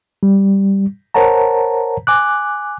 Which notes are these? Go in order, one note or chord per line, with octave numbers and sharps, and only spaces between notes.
G3
A#4 C5 C#5 F#5 A5 A#5
G#5 D6 F#6